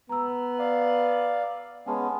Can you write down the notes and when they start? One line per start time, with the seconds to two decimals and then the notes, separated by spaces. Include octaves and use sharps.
0.09 B3 A#5 E6
0.59 D5 F5
1.86 G#3 B3 C#4 F#5 A5 B5